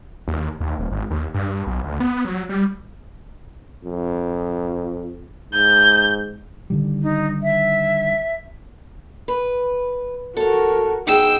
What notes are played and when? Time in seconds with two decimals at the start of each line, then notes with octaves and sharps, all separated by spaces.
0.28 D#2
0.61 D#2
0.79 D#1
0.92 G#1
1.11 D#2
1.34 G2
1.67 B1
1.84 D2
2.00 B3
2.25 F#3
2.49 G3
3.84 F2
5.53 G#2 G6
6.70 D3 D#3 G3
7.02 D#4
7.43 E5
9.28 B4
10.37 F#4 A4 A#4 C#5
11.07 B2 D#4 G#4 G5 E6